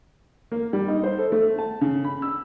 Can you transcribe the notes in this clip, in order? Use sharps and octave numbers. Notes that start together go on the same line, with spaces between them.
A#3
G3
D#4
C5
A4
A3
A5
C#3
B5
E6